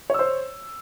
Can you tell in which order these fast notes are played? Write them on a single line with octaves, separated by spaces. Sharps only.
C#5 E6 C5